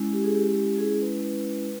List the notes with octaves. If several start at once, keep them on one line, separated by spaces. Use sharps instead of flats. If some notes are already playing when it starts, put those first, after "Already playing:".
Already playing: G#3 C#4 E4
G4
G#4
G4
G#3 C#4 E4 G#4
B4
B4